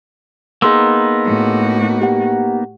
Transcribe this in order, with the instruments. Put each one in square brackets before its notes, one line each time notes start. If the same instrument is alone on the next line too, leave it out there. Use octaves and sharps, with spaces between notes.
[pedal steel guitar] A#3 B3 D#4 [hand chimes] G#4 C6 E6
[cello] A2 F#4
[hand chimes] G4 F#5